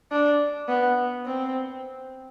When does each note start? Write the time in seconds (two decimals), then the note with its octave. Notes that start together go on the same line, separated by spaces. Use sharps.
0.11 D4
0.68 B3
1.26 C4